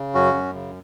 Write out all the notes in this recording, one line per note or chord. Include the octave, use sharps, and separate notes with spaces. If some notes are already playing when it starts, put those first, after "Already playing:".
Already playing: C#3
F#2 C#4 F#4
F#2
C#3